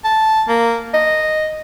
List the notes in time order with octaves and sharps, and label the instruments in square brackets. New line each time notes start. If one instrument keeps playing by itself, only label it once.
[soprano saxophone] A5
A#3
D#5